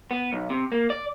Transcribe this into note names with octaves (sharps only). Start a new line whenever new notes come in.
B3
B1
C3
A#3
D5